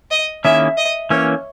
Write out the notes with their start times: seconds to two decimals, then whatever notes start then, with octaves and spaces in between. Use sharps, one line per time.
0.11 D#5
0.44 D#3 A#3 C#4 E4 G#4 E5
0.77 D#5
1.10 E3 A#3 C#4 C#5